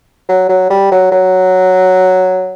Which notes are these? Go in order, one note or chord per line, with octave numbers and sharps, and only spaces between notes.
F#3
F#3
G3
F#3
F#3